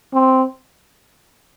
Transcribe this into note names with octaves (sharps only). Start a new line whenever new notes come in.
C4